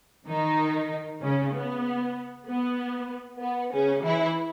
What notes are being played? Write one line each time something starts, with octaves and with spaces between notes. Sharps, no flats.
D#3 D#4
C#3 C#4
B3
B3
B3
C#3 C#4
E3 E4